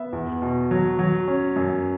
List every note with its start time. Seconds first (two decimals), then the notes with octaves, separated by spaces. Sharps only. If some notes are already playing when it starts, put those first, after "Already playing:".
Already playing: B3 E5
0.13 E2
0.42 B2
0.71 F#3
0.99 F#3
1.28 C#4
1.56 F#2